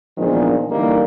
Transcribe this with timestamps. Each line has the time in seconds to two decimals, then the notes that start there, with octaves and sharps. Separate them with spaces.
0.18 E2 A#2 D#3 F3 G#3 D4
0.70 D3 E3 G3 A#3 D#4 E4